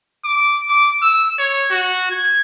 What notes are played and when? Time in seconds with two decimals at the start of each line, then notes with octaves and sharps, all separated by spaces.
0.25 D6
0.70 D6
1.02 E6
1.39 C#5
1.71 F#4
2.11 G#6